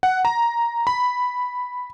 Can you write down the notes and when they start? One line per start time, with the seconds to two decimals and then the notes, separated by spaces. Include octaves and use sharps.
0.03 F#5
0.25 A#5
0.87 B5